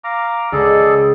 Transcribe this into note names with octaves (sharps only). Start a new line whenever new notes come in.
F5 A#5 D6
C#2 G#4 A4 D5